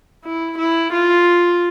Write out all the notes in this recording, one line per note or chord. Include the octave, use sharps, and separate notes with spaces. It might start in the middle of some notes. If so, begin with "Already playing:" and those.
E4
E4
F4